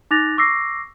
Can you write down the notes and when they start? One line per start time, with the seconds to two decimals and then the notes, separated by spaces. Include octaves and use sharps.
0.11 D#4 D6 F#6 A6 A#6 F7
0.38 C#6 D6 E6 A#6 C7